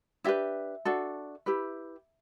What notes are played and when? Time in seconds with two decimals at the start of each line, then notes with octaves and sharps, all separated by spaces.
0.24 D4 E4 G4 B4 E5
0.85 D4 F#4 A4
1.46 E4 G4 B4